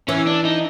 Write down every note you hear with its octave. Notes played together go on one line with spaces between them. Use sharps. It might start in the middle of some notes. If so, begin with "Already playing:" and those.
E3 C#4
D4
D#4